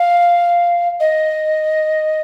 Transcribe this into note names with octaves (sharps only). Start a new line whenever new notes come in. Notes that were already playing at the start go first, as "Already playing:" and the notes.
Already playing: F5
D#5